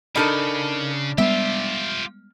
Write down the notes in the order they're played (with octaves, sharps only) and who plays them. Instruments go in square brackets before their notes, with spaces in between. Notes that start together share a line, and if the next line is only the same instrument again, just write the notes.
[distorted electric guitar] C#3 [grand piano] D4 B5 F6 [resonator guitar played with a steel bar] D#4 A4 A#4
[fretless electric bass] G3 G#3 B3 [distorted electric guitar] F4 G4 [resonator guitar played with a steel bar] E5